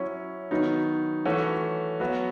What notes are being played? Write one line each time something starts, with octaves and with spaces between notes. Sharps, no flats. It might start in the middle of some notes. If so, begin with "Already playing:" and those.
Already playing: F#3 C#4 E4
D#3 F#3 B3 D#4
E3 A3 C#4 F#4
F#3 B3 F#4